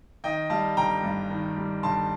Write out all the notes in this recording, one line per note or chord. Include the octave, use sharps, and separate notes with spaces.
D#3 D#5 G5
G3 F5 A5
G1 G5 A#5
G2
D#3
G3
G1 A5 C6